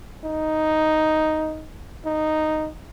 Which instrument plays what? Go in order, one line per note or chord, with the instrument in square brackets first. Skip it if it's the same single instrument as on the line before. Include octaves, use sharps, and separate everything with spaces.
[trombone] D#4
D#4